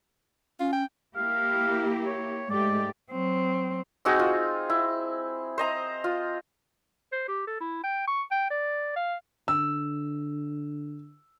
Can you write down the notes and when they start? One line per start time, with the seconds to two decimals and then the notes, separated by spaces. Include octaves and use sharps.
0.60 C#4 F4
0.72 G5
1.16 A#3 E4 G4 F5
2.06 C#5
2.50 G#2 G#3 A3 G4 D5
3.12 F#3 C4
4.05 C4 D#4 F#4 G#4
4.19 F4
4.69 E4
5.58 C5 D#5 A#5
6.04 F4
7.12 C5
7.28 G4
7.47 A4
7.60 E4
7.83 G5
8.07 C#6
8.31 G5
8.50 D5
8.96 F5
9.48 D3 E6